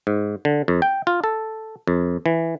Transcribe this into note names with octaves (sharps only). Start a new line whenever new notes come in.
G#2
D3
F2
G5
F4
A4
F2
E3